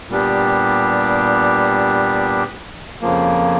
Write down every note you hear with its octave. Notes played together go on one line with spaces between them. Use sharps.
A#2 G3 B3 D4 G4
F2 C#3 F3 A#3